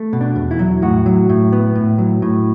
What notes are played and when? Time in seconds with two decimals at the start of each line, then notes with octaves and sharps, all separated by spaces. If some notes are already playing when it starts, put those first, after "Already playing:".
Already playing: A3
0.13 B2
0.21 D4
0.36 E2
0.51 E4
0.59 F#3
0.82 A2 F#4
1.06 F#3
1.29 A2
1.52 B3
1.75 A2
1.98 F#3
2.22 A2